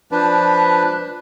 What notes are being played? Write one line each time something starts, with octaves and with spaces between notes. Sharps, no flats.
F3 D4 B4